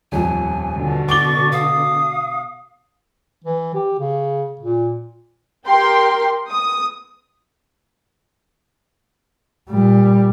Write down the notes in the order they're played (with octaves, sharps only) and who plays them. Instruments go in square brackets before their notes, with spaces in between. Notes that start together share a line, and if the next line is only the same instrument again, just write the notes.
[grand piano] D#1 F2 [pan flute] G#5
[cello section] B2 D3
[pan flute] C#6 [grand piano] D6 G7 [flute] A6
[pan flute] F5 [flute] D#6
[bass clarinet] E3
G4
C#3
A#2
[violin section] G4 A#4 G5 C6
D#6
[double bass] A#2 G3